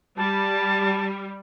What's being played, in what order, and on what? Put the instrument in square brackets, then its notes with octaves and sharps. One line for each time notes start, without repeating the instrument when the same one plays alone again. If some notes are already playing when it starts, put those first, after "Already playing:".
[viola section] G3 [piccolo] A5